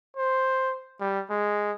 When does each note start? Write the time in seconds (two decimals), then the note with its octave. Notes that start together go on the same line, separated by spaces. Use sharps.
0.17 C5
1.00 G3
1.30 G#3